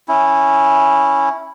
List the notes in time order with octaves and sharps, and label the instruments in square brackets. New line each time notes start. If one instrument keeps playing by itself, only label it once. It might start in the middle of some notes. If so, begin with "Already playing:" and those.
[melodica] C#4 E4